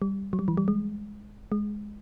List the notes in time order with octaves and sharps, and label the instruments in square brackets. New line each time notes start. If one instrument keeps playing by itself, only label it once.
[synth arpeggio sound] G3
F#3
G3
E3
G3
G#3
G#3